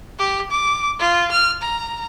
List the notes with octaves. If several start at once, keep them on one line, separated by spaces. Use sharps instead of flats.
G4
D6
F4
F6
A#5